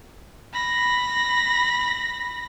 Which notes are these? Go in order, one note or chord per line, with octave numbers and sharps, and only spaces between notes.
B5 A#6